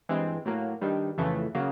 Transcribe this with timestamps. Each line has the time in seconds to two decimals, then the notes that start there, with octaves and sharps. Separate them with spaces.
0.09 G2 E3 G#3 C4
0.45 A2 F#3 A#3
0.81 G2 D#3 G3
1.18 F2 C#3 E3 A3
1.55 C#3 F#3 A#3